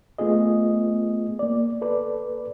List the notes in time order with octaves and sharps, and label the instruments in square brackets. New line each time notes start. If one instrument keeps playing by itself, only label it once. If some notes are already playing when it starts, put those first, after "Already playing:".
[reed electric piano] A3 B3 F4 G#4 D#5
A#3 D5
A4 B4 D5